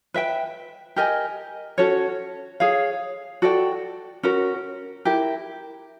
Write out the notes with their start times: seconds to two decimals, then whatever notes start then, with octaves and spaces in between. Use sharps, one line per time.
0.14 B4 E5 G5
0.96 G4 A#4 D#5 G#5
1.78 C#4 F#4 A4 C#5
2.60 G#4 C#5 F5
3.42 F#4 A4 D5 G5
4.23 C#4 F#4 A#4
5.05 E4 G4 A#4